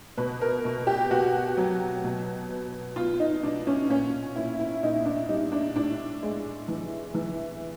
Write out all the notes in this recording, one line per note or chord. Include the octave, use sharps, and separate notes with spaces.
B2 B4
A#4
B2
G4
B2 F#4
F#3
B2
B3
B3 F4
D#4
B2 D4
C#4
A#2 C#4
A#2 E4
E4
A#2 D#4
D4
G3 D#4
D4
A2 D4
G#3
E3
E3